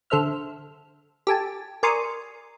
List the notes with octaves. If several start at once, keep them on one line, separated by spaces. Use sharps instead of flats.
D3 A4 C5 E5 F6
G4 A4 G#5 A5
A#4 D5 G#5 C6 C#6 D#6